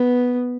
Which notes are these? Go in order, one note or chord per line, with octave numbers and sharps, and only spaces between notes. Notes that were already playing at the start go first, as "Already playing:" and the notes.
Already playing: B3